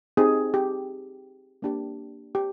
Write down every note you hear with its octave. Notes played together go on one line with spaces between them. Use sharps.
C4 D#4 G4 G#4
G4
A#3 D4 G4
G4